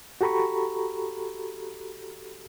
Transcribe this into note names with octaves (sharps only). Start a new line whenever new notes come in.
F#4 G4 A4 A#5 B5 C#6